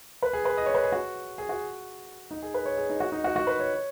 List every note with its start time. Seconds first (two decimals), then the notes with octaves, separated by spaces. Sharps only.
0.22 B4
0.33 G#4
0.45 B4
0.57 D#5
0.66 C#5
0.75 B4
0.84 G#4
0.92 F#4
1.38 G#4
1.49 F#4
2.31 D#4
2.42 G#4
2.54 B4
2.65 C#5
2.77 G#4
2.90 D#4
3.00 F#4
3.12 D#4
3.24 F#4
3.36 F#4
3.47 B4
3.60 C#5